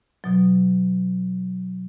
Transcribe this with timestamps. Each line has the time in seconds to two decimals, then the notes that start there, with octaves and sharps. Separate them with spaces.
0.24 B2 F#3